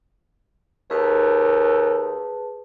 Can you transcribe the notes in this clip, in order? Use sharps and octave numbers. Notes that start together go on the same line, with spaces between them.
D#2 G#4 B4 A5